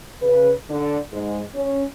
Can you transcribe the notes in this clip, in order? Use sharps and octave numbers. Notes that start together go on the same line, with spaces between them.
C#3 B4
D3 D4
G#2 G#3
C#4